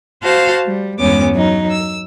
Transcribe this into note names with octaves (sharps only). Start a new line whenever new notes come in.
F#4 C5 F5 A5
G3
E2 G2 G#3 B3 C#4 D6
F#3 D#4
E6